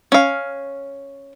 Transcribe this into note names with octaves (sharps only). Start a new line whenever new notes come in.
C#4 F5